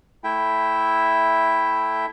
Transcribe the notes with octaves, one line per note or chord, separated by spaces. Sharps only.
A3 E4 E5 G5